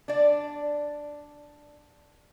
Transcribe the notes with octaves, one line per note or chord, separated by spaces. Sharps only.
D4 D5